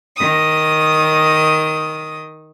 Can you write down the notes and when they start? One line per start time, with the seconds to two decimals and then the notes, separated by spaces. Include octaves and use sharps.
0.16 D#3 D#6